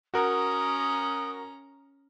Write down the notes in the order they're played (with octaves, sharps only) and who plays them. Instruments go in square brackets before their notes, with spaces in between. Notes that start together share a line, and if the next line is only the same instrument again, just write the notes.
[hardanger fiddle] C#4 A#5 [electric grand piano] F#4 A#4 [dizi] D#6